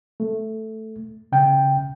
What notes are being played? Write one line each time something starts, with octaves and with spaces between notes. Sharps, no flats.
A3
C#3 G5